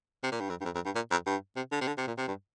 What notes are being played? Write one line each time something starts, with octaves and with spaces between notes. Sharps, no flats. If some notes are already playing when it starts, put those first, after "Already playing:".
C3
A#2
G2
F2
G2
F2
F2
G2
A#2
F2
G2
C3
D3
C3
D3
C3
A#2
C3
G2